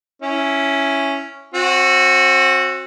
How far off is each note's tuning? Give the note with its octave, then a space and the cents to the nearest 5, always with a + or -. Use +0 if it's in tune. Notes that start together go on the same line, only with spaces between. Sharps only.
C#4 +0 E4 +0
C4 +35 F#4 -10